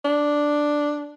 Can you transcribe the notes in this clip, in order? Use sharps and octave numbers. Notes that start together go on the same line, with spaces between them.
D4